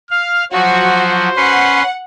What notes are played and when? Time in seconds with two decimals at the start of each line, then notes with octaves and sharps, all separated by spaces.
0.11 F5 F6
0.52 F3 F#3 F#4 C5
1.36 C#4 B4 F#5 C6